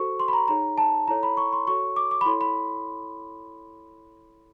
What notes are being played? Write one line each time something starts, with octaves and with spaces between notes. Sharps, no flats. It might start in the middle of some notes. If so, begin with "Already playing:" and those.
Already playing: F#4 A4 C5 C#6
C6
B5
A#5
D#4 G#4 C#5 A#5
A5
E4 A4 C#5 A#5
B5
C#6
C6
F#4 A4 C#5 C#6
D6
D6
B5
E4 A4 C#5 C6
B5